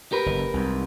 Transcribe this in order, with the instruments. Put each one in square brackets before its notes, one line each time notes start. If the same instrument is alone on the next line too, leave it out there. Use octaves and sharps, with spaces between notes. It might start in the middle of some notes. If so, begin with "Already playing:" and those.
[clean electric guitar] G4 A#4 B4
[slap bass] F#1
C2 G#2